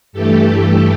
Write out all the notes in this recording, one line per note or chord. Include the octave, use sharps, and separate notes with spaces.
G2 E3 A3 G4 A4